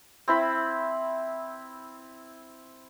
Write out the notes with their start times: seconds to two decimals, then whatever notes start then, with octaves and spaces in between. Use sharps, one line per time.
0.28 C4 E4 B5